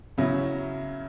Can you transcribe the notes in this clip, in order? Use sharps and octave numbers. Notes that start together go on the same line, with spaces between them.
C#3 F#3 C#4 E4